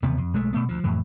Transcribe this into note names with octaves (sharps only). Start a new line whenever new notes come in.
E1 D#2 C3 B3
F2
B1 G#3 A3
B2 A3 B3
D2 F3
F2 A2 E3